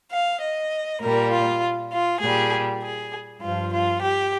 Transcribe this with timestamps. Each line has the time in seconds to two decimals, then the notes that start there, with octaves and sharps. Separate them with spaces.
0.10 F5
0.41 D#5
1.00 A#2 G3 A#4
1.31 F4
1.91 F4
2.20 A#2 G3 G#4
2.82 G#4
3.40 G2 F4
3.46 F3
3.71 F4
4.01 G4